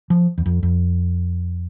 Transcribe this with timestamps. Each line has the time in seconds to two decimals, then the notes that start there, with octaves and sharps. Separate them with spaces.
0.10 F3
0.38 E2
0.46 F2
0.63 F2